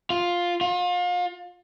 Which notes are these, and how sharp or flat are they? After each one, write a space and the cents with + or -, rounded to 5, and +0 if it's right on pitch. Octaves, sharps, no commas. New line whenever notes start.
F4 +5
F4 +35